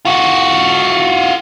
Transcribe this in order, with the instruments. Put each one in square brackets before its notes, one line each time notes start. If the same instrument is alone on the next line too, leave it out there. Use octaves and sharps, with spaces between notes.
[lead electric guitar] F4 F#4